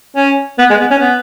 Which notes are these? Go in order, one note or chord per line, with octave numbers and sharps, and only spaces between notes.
C#4
B3
G#3
B3
C#4
B3